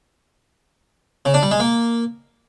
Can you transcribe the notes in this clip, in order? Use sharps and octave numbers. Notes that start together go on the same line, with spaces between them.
C#3
D4
G3
G#3
A#3